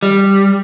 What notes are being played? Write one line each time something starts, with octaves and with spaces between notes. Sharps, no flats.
G3